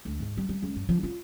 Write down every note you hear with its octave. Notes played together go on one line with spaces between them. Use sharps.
D2
G#2
G3
G3
C#2
G2
F3
F4